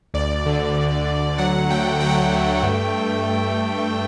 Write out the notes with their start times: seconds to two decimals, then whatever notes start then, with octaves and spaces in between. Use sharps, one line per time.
0.14 D2 D5
0.46 D3
0.77 D2
1.08 D3
1.38 F#3 F#5
1.70 A3 G5
2.00 F#3 G5
2.09 F#5
2.15 G5
2.32 A3
2.63 G2
2.94 G2